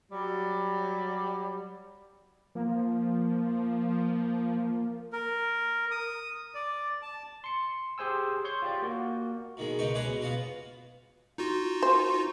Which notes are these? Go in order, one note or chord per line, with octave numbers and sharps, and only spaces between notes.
F#3 G3
F3 A#3
A#4
D#6
D5
A5
C6 C#7
G4 G#4 C5 G#5 E6
C#5 C6 C#6 G6
F4 G4 D5
A#3 F#4
B2 D#3 G#3
C#2 B2 D#4 B4 G5 C#6
G#3 C#4 G#4 B4 C#5 F#5
B2
B3 F4 F#4 B4
D#4 F4 F#4
C5